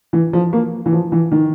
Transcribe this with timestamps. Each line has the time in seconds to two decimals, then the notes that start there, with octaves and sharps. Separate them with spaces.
0.13 E3
0.33 F3
0.53 A#3
0.86 E3
0.93 F3
1.12 E3
1.32 D#3